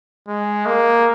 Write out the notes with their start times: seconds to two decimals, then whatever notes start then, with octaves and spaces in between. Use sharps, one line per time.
0.27 G#3
0.66 A#3